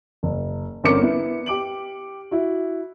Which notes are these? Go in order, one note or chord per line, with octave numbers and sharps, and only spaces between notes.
F#1
G1 C4 C#4 A#4 D6 C#7
B3 E4
G4 D6 D7 F#7
E4 F#4